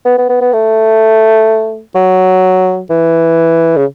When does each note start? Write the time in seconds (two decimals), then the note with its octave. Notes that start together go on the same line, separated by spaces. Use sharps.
0.05 B3
0.18 B3
0.29 B3
0.41 B3
0.53 A3
1.95 F#3
2.90 E3
3.76 C#3